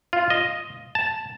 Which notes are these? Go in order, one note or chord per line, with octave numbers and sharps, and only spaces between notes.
F4
D#5
A5